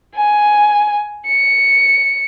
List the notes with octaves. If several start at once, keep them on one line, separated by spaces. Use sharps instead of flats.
G#5
C#7